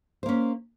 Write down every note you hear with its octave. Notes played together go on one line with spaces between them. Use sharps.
A#3 C#4 C5